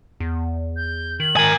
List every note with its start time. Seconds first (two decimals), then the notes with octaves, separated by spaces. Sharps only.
0.20 E2
0.76 G6
1.20 D#3 F#7
1.37 A#4 G#5